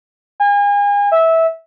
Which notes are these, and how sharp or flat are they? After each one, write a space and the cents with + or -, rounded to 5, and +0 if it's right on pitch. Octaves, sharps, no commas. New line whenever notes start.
G#5 -35
E5 -15